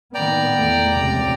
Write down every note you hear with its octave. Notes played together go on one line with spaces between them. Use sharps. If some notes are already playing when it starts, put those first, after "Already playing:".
A2 D#3 B3 D5 G5 A#5
E2 A3
F1 C#2 C3